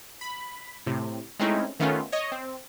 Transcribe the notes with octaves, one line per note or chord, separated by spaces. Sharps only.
B5
A2 C3
G#3 A3 C4 C#4 D#4 E4
D#3 A3 B3 C#4 F4
C#5 D#5
C4